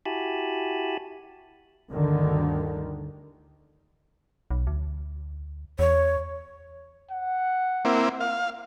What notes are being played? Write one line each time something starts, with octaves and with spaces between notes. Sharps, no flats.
E4 F#4 G4 G#5 A5 B5
G1 D2 D3 D#3
B1
D2
E2 C#5
F#5
A#3 C4 E4
F5